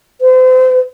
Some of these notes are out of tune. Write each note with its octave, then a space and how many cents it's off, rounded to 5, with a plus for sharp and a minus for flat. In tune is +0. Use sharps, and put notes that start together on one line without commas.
C5 -35